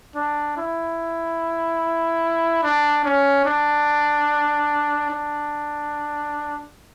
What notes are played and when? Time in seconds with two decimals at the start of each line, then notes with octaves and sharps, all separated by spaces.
0.16 D4
0.57 E4
2.63 D4
3.04 C#4
3.46 D4
5.10 D4